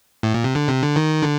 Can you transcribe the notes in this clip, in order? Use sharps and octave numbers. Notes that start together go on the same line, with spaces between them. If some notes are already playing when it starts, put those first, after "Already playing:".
A2
A#2
C3
D3
C3
D3
D#3
D3